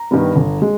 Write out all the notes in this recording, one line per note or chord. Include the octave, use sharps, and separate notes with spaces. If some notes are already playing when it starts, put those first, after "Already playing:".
Already playing: A#5
G2 D#3 G3 B3
G1
G#3